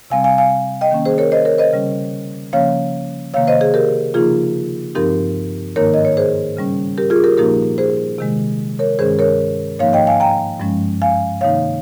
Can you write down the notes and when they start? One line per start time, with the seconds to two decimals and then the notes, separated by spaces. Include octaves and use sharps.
0.10 C3 G3 C4 F5 G#5
0.24 F5 G#5
0.38 F5 G#5
0.81 D#5 G5
0.91 D#3 A#3 C#4
1.05 G#4 C5
1.18 A#4 C#5
1.32 C5 D#5
1.45 A#4 C#5
1.58 C5 D#5
1.73 C#3 G3 C#4
2.53 C#3 F3 A#3 C#4 C#5 F5
3.34 C3 D#3 A#3 C#5 F5
3.47 C5 D#5
3.61 G#4 C5
3.74 G4 A#4
4.14 C#3 F3 A#3 D#4 F4 G#4
4.95 G2 F3 C4 D#4 G4 A#4
5.76 G#2 D#3 A#3 D#4 A#4 C#5
5.94 D#5
6.05 C#5
6.17 G#4 C5
6.57 C#3 G3 C#4
6.98 G4 A#4
7.10 F4 G#4
7.24 G4 A#4
7.38 A#2 F3 A#3 D#4 G4 A#4
7.78 G#4 C5
8.18 C3 D#3 G#3
8.79 A#4 C#5
8.99 G2 D#3 G#3 C#4 G#4 C5
9.19 A#4 C#5
9.79 G#2 F3 A#3 D#4 C#5 F5
9.93 D#5 G5
10.07 F5 G#5
10.20 G5 A#5
10.60 G2 F3 G#3 C#4
11.02 F5 G#5
11.41 C3 D#3 A#3 D#4 C#5 F5